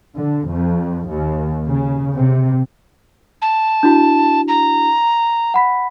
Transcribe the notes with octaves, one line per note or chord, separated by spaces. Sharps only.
D3
F2
D#2
C#3
C3
A5
D4 E4 F#4
A#5
F#5 B5 B6